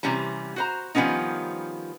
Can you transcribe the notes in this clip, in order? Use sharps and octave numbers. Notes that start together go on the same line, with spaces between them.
C3 E3 G3 C#4 A#5
F#4 C5 A#5
D#3 F3 G3 B3 C#4 D#4